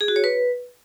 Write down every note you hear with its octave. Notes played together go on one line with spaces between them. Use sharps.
G#4
F#4
C#5
B4